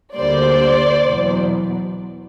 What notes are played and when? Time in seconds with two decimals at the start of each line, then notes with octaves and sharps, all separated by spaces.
0.16 D2 D3 G3 A#3 C5 D5
1.04 E2 B2 F#3